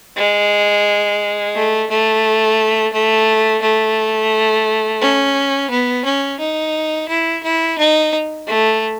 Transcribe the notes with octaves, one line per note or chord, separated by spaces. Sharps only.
G#3
A3
A3
A3
A3
C#4
B3
C#4
D#4
E4
E4
D#4
A3